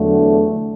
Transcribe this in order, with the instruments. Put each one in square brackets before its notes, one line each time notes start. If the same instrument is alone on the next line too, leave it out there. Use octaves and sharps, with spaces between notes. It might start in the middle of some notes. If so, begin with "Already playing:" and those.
Already playing: [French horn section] E2 D3 F#3 A3